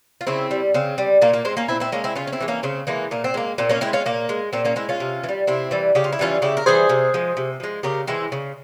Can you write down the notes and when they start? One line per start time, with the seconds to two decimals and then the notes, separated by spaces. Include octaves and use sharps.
0.21 F4
0.27 C#3 C4 E4
0.51 G3
0.74 C#3 C4
0.98 G3
1.22 A#2 A#3
1.33 A#3
1.45 G#3 C4
1.57 A#3 C#4
1.68 A#2 C4 E4
1.80 C4 E4
1.92 G#3 A#3 C#4
2.04 C4 E4
2.15 C#3 C#4 F4
2.27 C#4
2.32 C4 E4
2.40 E3 G#3
2.48 A#3 C#4
2.63 C#3 C4
2.87 E3 G#3 A#3
3.11 A#2 A#3
3.24 C4
3.34 G#3 A#3
3.58 A#2 C4
3.69 A#3 C#4
3.81 G#3 C4 E4
3.93 C#4 F4
4.06 A#2 A#3
4.29 G#3
4.53 A#2 C4
4.65 A#3 C#4
4.76 G#3 C4 E4
4.89 C#4 F4
5.00 C3
5.23 E3
5.29 G3
5.47 C3 C4 E4
5.71 E3 G3
5.95 C#3 G4
6.04 F4
6.12 E4
6.19 E3 G3 C#4 F4
6.42 C#3 E4 G4
6.57 A#4
6.66 E3 G3 G#4 C5
6.89 C3
7.14 F3 G#3
7.37 C3
7.60 F3 G#3
7.83 C#3 G4 A#4
8.07 E3 G#3 C4 E4
8.32 C#3